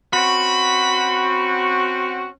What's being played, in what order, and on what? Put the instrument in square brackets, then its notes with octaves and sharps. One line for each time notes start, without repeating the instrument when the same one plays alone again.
[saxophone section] C4 C#4 F#4 [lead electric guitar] B5